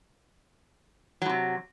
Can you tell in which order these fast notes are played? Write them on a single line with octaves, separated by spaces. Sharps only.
F#3 A2 C3